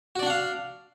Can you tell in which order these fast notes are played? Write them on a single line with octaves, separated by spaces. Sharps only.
F#4 D5 D4 F#5 F5